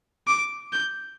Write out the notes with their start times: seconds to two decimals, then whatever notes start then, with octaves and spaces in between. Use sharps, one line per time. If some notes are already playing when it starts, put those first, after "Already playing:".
0.27 D6
0.73 G6